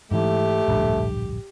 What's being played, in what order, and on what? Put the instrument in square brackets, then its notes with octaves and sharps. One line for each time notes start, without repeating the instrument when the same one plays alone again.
[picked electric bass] G#2 E3 [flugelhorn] A3 [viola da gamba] G4
[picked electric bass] D1 A#1 G2